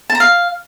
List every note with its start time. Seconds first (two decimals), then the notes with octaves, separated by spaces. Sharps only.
0.10 A5
0.15 A#5
0.20 F5